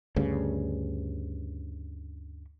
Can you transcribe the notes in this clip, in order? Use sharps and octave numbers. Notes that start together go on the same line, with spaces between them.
D2 G2 C#3